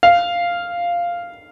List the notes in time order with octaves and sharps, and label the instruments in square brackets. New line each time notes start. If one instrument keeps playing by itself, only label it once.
[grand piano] F5